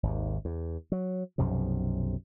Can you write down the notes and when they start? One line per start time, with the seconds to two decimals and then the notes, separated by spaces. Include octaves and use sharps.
0.03 G#1 D#2
0.45 E2
0.92 F#3
1.38 B1 F#2 C3 F3